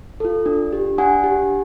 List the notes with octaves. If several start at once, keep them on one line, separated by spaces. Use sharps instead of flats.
F4 A4
D4
G4
D4 F#5 G#5
G4